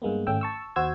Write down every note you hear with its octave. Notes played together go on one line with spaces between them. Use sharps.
G2 G#3 A#3 B3
G#1 A3 C#4 G5 E6
A5 C#6 E6
D#2 F#4 C5 E6 G#6